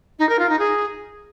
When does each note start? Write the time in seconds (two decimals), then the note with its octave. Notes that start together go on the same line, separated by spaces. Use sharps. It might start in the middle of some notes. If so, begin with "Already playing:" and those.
0.19 D#4
0.29 A#4
0.39 F4
0.49 D#4
0.59 G#4